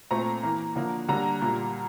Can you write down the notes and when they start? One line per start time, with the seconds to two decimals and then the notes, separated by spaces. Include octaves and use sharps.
0.11 A#2 A3 C4 A#5
0.43 E3 A#3
0.76 D3 F3 A#3
1.08 D3 G3 A#3 A#5
1.42 A#2 G3 A#3